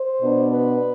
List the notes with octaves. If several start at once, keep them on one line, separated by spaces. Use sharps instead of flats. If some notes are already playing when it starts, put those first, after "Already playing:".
Already playing: C5
B2 B3 D4
B4